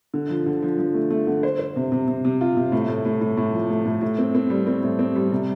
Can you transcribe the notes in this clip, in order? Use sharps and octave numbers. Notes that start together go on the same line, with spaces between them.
D3
F3
D3
F3
F3
A3
A3
D3
C5
C5
C3
C3
C3
C3
F4
C3
A2
A2
A2
A2
A2
F3
A3
A2
A2
C4
C4
G3
C4
A2
C4
G3
C3